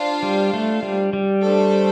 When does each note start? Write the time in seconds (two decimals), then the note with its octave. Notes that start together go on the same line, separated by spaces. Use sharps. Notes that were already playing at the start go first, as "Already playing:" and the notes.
Already playing: D4 F4 C5 F5
0.23 G3
0.54 A3
0.83 G3
1.13 G3
1.43 A3 D4 A4 C5